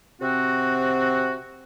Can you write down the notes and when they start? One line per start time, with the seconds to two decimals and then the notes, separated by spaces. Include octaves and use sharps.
0.21 C3 C4 F#4